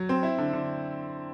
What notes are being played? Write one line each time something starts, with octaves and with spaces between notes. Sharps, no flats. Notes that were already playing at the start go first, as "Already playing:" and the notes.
Already playing: F#3
C4
E4
D3
D3